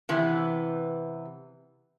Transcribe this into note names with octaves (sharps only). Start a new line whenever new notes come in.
C3 E3 B3